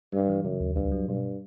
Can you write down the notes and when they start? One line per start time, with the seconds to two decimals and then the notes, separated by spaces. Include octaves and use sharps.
0.13 G2 G3
0.29 E3
0.44 F#2 C#3
0.60 D#2
0.76 C#2 G2
0.92 F#3
1.08 G2 B2